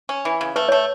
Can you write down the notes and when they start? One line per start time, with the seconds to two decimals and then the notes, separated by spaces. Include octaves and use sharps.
0.09 C#4
0.25 E3
0.41 C#3
0.56 A3 B4
0.69 A3 C#5